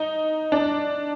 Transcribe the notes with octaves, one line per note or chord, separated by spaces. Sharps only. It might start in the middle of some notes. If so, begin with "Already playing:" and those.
Already playing: D#4
D4